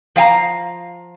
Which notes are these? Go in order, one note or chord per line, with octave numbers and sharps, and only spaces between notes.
F3 F5 G5 A#5